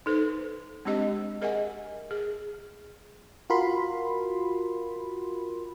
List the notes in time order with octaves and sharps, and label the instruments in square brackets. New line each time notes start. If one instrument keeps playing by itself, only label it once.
[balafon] D#4 A4 B4 C5
G#3 C4 D4 G4 C5 D#5
G#4 A#4 D#5 E5 F#5 G#5
G#4
[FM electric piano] F4 F#4 A#4 B5 C6